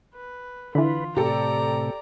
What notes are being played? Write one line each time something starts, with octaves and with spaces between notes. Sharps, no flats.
B4
D3 E3 F4 B4
A2 C3 G4 A4 D5 A#5